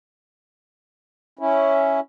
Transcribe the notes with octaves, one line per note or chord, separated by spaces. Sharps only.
C#4 E4